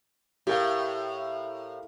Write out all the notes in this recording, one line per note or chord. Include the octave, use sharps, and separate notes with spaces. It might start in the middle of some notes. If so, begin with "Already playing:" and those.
A2 G4 A#4 F5